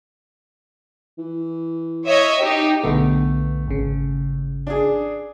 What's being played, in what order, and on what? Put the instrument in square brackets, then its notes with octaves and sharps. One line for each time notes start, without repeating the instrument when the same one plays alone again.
[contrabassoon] E3
[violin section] C#5 D#5 E5
D#4 G4
[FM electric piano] B1 D3 B3 [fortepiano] A3
[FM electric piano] G#1 C#3
[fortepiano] D4 G#4